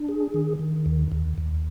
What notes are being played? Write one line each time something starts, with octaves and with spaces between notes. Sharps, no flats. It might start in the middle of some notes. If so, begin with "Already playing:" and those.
Already playing: D4
G#4
D#3
D#3
D#2
D#2
D#2